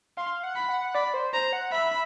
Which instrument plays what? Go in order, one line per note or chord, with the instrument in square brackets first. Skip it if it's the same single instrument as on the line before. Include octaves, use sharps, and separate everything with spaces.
[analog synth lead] F5 [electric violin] C6
[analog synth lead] F#5
[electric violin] B5
[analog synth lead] F#5
[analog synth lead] D5 [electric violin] B5
[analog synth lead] C5
[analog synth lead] C5 [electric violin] A#5
[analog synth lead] F#5
[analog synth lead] E5 [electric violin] B5